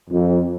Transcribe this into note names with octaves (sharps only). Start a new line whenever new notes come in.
F2